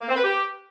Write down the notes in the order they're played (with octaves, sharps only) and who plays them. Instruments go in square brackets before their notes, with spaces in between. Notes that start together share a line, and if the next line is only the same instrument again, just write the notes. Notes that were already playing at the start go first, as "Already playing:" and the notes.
[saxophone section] A#3
C4
B4
G4